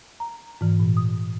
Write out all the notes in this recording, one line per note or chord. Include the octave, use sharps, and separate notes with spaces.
A#5
G#2 E3
A#2
D#6